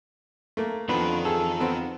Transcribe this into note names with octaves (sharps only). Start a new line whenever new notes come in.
A3 A#3
F2 F3 B3 D4 D#4 B4 G5
G#4 A4
B3 C4